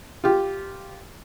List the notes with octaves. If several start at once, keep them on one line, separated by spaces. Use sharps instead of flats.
F4 G4